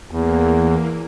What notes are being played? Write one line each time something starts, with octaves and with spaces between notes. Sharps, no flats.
E2 E3 A#3